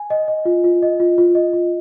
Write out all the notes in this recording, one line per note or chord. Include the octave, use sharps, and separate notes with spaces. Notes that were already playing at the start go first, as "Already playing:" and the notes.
Already playing: G#5
D#5
D#5
F4
F4
D#5
F4
F4
D#5
F4